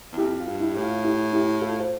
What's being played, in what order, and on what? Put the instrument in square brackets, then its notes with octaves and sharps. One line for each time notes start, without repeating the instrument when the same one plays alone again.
[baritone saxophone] E2
[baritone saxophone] F2 [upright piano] E4 G4
[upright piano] F4
[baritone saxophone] G2
[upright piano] E4
[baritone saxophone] A2 [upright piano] G4
[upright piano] F4
E4 G4
E4 G4
F4 A4
C5